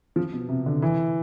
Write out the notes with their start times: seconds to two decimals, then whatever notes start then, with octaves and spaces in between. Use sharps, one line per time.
0.16 F3
0.33 B2
0.49 C3
0.66 D3
0.82 E3